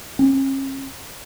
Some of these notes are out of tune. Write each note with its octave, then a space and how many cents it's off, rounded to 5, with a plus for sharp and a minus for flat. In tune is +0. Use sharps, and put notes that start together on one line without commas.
C#4 -45